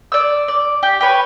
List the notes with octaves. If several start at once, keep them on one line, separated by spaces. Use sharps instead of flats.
D5 E6
D5
G4
G4 B4 C#5